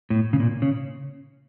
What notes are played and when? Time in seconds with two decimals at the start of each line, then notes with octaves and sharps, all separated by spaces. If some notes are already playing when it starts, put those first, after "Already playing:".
0.10 A2
0.33 C#3
0.40 A#2
0.62 C#3